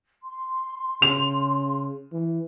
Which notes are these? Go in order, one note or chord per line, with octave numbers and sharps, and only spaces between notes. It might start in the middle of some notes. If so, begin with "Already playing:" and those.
C6
C#3 F7
E3